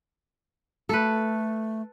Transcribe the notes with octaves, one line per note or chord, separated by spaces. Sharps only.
A3 A4 B4